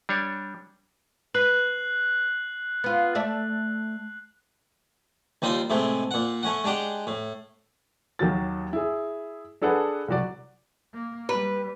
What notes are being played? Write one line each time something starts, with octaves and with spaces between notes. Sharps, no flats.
G3 D4 C#5
B4 F#6 C7 F#7
B3 F4
A3 D5 E5
D#2 G3 D#4 F4 C6
A2 C3 G#3 A3
A#2 F#5
A3 C#4 F#5
G#3 D4 G4 F#5
A2
D#2 D#3 F#3 F#4 A6
E4 G#4
D4 G#4 A4 B4 F#5
C2 F#3 F#4 D5
A#3
G3 B4